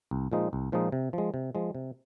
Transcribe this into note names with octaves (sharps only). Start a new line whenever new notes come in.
C2
A#2 F3 G#3 D#4
C2
A#2 F3 G#3 D#4
C3
F3 G#3
C3
F3 G#3
C3